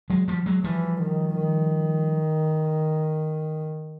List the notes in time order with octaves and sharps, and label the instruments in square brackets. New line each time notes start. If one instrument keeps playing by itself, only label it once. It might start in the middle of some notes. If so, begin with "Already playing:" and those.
[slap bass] F#3 G#3
F3 G3
F#3 G#3
[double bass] E3 [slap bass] F3 G3
[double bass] D#3
D#3